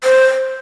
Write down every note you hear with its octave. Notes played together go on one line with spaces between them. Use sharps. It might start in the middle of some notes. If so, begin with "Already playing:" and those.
C5